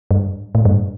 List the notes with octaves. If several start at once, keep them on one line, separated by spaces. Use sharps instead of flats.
G2
A2
G2